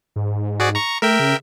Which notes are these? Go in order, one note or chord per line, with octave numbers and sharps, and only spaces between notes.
G#2
F#4 G#4 D5
A#5 C#6
A3 A#4 E5 G5
C#3